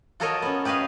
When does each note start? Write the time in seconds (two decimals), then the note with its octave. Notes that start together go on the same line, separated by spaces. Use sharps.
0.20 F4 F#4 A4 A#4 C#5 D#5
0.42 B3 C#4
0.65 G4 B4 C#5 D#5 F5